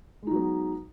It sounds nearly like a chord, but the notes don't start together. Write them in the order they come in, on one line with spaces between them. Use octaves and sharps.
G#3 D#4 F#3 B3